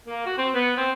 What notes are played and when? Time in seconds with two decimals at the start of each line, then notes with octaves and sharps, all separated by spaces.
0.07 A#3
0.26 F#4
0.38 C4
0.55 B3
0.77 C4